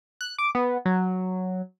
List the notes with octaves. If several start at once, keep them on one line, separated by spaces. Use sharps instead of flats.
F#6
D6
B3
F#3